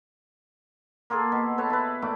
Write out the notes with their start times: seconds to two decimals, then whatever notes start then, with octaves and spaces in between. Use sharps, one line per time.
1.10 A#3 F4 G#4 A4
1.32 B2
1.58 A4 B4 C#5 A5
1.70 E4 B4
2.02 A#2 A3 D6